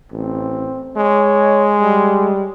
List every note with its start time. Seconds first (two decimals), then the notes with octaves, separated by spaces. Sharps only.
0.12 A1 C4
0.97 G#3 C#5
1.79 G3